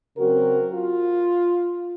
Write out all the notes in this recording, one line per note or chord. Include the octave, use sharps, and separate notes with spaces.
C#3 F#3 C4 F#4 A#4
F4